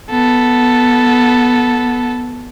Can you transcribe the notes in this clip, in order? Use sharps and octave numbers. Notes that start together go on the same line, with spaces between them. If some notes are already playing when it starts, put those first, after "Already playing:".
B3 A4